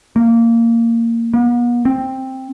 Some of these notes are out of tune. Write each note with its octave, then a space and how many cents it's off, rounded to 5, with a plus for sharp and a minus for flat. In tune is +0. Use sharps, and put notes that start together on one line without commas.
A#3 -15
B3 -45
C4 +10